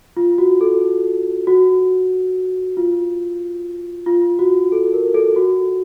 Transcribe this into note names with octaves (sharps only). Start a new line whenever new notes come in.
F4
F#4
A4
F#4
F4
F4
F#4
A4
A#4
A4
F#4